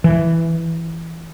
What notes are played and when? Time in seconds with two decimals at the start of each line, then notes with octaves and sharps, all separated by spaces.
0.04 E3